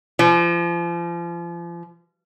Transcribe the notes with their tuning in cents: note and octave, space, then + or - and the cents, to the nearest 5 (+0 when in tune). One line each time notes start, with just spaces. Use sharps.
F3 -35